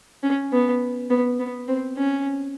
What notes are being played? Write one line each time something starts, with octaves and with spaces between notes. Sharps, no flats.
C#4
B3
B3
B3
C4
C#4